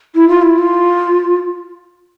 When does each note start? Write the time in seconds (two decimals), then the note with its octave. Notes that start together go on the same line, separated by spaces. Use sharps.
0.15 E4
0.29 F4
0.42 E4
0.58 F4